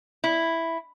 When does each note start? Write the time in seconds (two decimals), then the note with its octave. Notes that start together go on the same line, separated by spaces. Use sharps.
0.24 E4